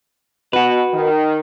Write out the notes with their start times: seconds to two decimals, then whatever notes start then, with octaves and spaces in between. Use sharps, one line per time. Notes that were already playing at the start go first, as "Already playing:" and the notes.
0.53 B2 F#4 B4
0.93 D#3